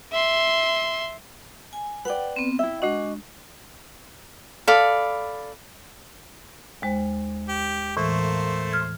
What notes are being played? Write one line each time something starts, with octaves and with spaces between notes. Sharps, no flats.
E5 C6
G#5
B4 D5 F#5 G5
B3 C4
E4 E5 G5
G#3 D4 F#4 D#5
A4 D5 F5 B5
D#2 G#3 C5
G4
A2 E3 A3 A#3 C5
F6 G#6